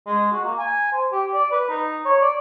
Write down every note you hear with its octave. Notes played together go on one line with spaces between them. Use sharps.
G#3
F#4
A#3
G#5
C5
G4
D5
B4
D#4
C#5
D5